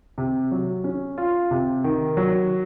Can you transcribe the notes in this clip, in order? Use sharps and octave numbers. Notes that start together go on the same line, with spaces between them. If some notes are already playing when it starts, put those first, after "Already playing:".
C3
F#3
C#4
F4
C3
D#3
F#3